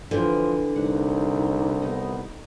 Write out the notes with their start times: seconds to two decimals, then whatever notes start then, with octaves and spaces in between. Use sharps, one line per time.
0.11 D3 E3 F3 G4 G5
0.76 C2 D#4 F#5
1.82 B3 D#4